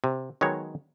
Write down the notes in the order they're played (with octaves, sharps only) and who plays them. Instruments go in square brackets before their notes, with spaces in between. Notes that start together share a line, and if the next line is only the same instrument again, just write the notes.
[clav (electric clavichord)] C3
D#3 F#3 G#3 B3 C#5